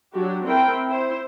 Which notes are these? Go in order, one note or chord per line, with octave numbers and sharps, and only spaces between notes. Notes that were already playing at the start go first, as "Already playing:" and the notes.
F#3 D4 F#4 G4
C4 E4 A#4 G5
E4 C5